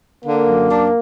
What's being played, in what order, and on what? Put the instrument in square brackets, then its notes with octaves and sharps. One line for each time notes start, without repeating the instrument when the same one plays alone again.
[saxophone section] D3 [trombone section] A#3
[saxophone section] F#2
D4